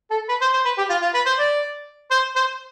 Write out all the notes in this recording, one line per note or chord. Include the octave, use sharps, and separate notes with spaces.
A4
B4
C5
C5
B4
G4
F4
F4
B4
C5
D5
C5
C5